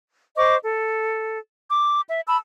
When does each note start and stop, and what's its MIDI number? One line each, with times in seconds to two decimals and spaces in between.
0.37 0.56 72
0.37 0.56 75
0.37 0.56 85
0.37 0.56 86
0.63 1.37 69
1.71 2.01 86
2.08 2.22 76
2.28 2.37 81
2.28 2.37 83
2.28 2.37 88